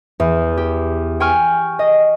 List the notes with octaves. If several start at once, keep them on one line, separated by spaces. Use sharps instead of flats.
E2
G4
G5 G#5 C#6 F6
D#5